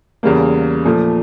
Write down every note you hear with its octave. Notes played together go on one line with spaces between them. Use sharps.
E2 C#3 G3 A#3
A#2 F3 A3